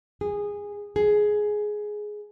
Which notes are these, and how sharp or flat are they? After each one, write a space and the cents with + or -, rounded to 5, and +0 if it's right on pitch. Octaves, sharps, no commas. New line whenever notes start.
G#4 -15
G#4 +10